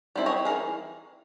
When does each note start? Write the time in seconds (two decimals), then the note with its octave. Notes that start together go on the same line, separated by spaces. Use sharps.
0.16 G3 C4 E4
0.26 C#5 D#5
0.45 E3 G#4 A#4